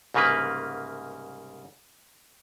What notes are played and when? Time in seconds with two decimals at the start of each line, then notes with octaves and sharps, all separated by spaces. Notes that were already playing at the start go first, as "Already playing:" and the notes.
0.14 C2 G#2 C#3 A#3 B4